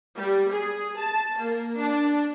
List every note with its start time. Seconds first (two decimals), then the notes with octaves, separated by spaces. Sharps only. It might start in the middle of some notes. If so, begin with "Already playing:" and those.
0.15 G3
0.49 G#4
0.99 A5
1.38 A#3
1.78 D4